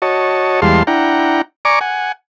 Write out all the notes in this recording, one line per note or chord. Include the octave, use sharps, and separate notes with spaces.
F#4 C#5 D#5 A5
E2 G3 G#3 F5 A5 C6
D4 E4 F#5 G5 A#5
D5 G#5 A#5 C#6 D6
F#5 G#5